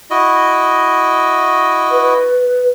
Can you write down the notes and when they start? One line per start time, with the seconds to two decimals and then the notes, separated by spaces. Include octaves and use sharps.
0.10 E4 F#4 D#5
1.91 B4